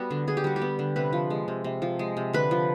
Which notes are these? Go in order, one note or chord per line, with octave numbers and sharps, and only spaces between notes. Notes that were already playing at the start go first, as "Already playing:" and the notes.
Already playing: G3 B3 F#4
D3
D3 G#4
G4
G3 F#4
G4
B3
D3
C3 B4
F3
G#3
C3
C3
F3
G#3
C3
D3 B4
F3